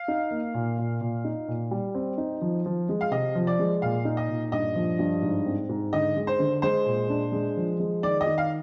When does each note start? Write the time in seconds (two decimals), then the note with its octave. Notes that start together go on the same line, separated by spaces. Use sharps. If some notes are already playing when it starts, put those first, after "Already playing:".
Already playing: F5
0.08 D#4
0.31 A#3
0.54 A#2
0.78 A#2
1.01 A#2
1.25 D#4
1.48 A#2
1.71 G3
1.95 C4
2.18 D#4
2.41 F3
2.66 F3
2.89 G#3
3.01 F5
3.11 C3 D#5
3.35 F3
3.47 D5
3.59 G#3
3.82 A#2 F5
4.05 D#4
4.17 D#5
4.29 A#2
4.52 G2 D#5
4.75 F3
4.99 G2
5.22 G#2
5.46 C4
5.69 G#2
5.93 D3 D#5
6.16 G#3
6.27 C5
6.39 D3
6.62 G#3 C5
6.86 A#2
7.09 D4
7.32 G#3
7.57 F3
7.80 G#3
8.02 D#3 D5
8.21 D#5
8.26 D#3
8.38 F5